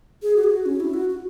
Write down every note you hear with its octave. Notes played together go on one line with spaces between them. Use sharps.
G#4
F#4
G#4
F#4
C#4
E4
F#4
F#4